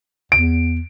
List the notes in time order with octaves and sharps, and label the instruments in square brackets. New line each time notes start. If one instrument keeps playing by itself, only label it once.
[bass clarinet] E2 [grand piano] D7